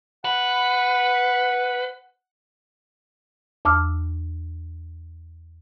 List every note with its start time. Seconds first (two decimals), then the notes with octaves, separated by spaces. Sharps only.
0.25 B4 F#5
3.65 E2 A5 D6 E6 F6